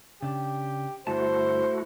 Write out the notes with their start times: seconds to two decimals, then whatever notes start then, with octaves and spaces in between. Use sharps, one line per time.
0.22 C#3 D4 G4
1.07 G2 D3 A3 E4 F#4 C5 A5